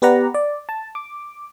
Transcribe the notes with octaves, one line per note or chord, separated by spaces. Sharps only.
B3 G4 B4 D5 F#5 A#5
D5
A5
D6